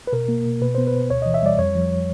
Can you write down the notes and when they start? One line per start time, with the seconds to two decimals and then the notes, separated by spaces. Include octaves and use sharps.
0.07 B4
0.12 B2 A#4
0.28 A#3
0.46 B2
0.61 B2 B4
0.75 B3 C5
0.87 B4
0.94 B2
1.10 D2 C#5
1.22 E3 D#5
1.34 E5
1.43 G3 D5
1.58 F2 C#5
1.75 F3